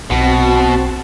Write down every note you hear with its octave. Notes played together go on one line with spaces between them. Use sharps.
B1 B2 C4 F#4 A5